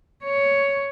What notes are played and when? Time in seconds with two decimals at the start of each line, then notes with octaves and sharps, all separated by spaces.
0.23 C#5